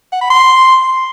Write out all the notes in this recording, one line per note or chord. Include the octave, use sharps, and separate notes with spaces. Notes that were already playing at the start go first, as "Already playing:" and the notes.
F#5
B5
C6